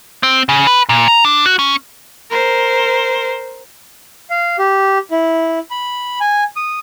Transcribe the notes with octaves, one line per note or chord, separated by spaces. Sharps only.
C4
C#3
B4
A#2
A#5
D4
F#4
C#4
A#4 C5
F5
G4
E4
B5
G#5
D#6